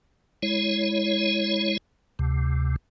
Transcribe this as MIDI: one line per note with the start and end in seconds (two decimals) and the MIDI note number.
0.43 1.77 56
0.43 1.77 64
0.43 1.77 73
2.19 2.76 38
2.19 2.76 48